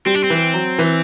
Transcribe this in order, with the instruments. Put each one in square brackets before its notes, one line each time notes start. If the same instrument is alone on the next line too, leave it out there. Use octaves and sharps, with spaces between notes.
[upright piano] G3 [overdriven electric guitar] C4
[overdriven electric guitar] D4
C4
[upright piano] E3
F#3
E3